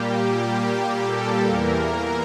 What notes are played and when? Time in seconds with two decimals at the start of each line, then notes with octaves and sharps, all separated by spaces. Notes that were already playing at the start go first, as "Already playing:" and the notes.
Already playing: A#2 G3 A#3 G4
1.00 A4
1.45 E2 E3 A#3 A#4
1.92 A#4